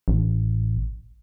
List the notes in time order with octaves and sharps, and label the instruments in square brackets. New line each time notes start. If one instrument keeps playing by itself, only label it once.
[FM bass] A1